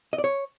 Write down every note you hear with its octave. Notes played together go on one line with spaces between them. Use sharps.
D#5
D5
C#5